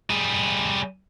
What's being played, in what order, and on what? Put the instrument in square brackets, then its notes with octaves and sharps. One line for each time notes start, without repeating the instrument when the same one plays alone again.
[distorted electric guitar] G3 G#4